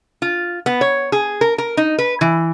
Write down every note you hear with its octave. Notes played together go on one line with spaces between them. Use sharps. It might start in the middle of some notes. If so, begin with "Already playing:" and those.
F4
B3
C#5
G#4
A#4
A#4
D#4
B4
E3